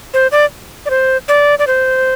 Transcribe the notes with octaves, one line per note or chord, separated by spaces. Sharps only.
C5
D5
D5
C5
D5
D5
C5